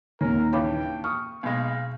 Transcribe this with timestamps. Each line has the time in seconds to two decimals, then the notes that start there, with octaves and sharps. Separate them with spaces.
0.21 D#1 D#3 A#3 C4 C#4 A#4
0.53 G2 C#3 E3 C#5 G5 B5 D6
1.04 C#6 D#6 F6
1.43 B1 B2 G#3 F5